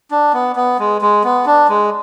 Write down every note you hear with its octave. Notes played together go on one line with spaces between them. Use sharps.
D4
B3
B3
G#3
G#3
B3
D4
G#3